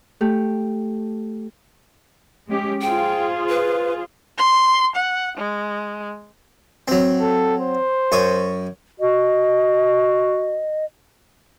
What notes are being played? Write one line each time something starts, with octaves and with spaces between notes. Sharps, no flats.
A3 G4
G#3 C#4 G4
F4 G#4 C5 G5
B4
C6
F#5
G#3
F#3 C4
A4
C5
F#2 C#6 D#6
F#4 D#5